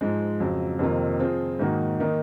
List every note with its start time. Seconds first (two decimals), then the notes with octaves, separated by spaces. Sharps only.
0.01 G#2 F3 G#3
0.40 F2 C#3 F#3
0.79 F2 C3 D#3 A#3 F4
1.19 F3 C4 F4 G#4
1.59 G#2 D#3 A#3 D#4 F#4
2.00 D#3 A#3 D#4